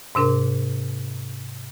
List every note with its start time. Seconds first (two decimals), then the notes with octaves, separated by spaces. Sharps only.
0.15 G#2 C3 D4 A#4